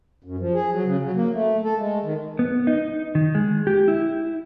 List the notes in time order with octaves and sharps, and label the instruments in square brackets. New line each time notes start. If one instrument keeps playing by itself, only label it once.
[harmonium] F#2
F3
G#4
F#3
C#3
F#3
A#3
A3
A4
G#3
D#3
[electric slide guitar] B3
D#4
D#3
G#3
G4
E4